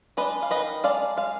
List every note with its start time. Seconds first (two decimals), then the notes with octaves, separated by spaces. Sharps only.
0.17 G#3 D4 B4 D#5
0.43 F5
0.51 D#3 B4 D#5
0.84 G#3 D4 D5 F5
1.17 G#3 F5